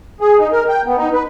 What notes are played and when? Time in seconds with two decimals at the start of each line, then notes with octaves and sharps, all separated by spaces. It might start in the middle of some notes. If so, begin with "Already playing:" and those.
0.21 G#4
0.38 D#4
0.52 A#4
0.68 G5
0.86 B3
0.98 D#4
1.13 B4